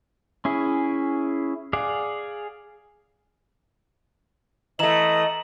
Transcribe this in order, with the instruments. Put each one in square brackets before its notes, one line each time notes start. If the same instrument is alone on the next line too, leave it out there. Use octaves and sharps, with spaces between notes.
[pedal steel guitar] C#4 E4 G#4
G#4 D5 F5 F#5
[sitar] E3 A3 [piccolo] D#5 [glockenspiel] A#5 E7 F#7